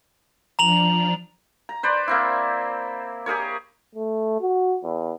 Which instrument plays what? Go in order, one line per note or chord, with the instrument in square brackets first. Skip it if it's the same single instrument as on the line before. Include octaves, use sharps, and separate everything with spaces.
[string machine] F3 D4 [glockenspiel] A#5 F7 F#7
[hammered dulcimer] A#5
B4 C5 D5
A#3 C4 E4
G4 G#4 A#4 C#5
[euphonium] A3
F#4
E2